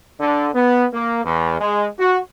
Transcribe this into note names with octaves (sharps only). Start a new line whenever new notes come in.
D3
B3
A#3
E2
G#3
F#4